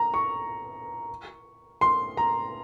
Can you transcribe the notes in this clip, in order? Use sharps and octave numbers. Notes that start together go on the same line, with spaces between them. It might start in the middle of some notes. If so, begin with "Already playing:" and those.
Already playing: A#5
C#6
C6
A#5